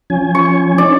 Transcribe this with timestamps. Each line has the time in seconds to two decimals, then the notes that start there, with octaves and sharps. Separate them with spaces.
0.10 F3 C#4 G#5
0.35 C#6
0.78 C#4 D#4 C#5 D5 D6